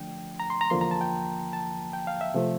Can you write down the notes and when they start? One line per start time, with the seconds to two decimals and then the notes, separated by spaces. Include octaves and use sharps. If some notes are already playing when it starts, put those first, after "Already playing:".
Already playing: D3 F3 A3 D4 G5
0.40 A#5
0.50 C6
0.61 A#5
0.70 E2 D3 F3 A#3 C6
0.81 A#5
0.91 A5
1.01 G5
1.53 A5
1.93 G5
2.07 F5
2.21 E5
2.34 C3 F3 A3 C4